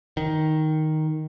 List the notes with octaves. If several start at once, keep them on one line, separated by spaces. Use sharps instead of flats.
D#3